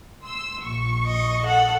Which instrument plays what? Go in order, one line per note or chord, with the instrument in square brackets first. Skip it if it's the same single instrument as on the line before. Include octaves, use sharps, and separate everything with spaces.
[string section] C6 E6
A#1 C#6
[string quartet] D#5
[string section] A4 [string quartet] F#5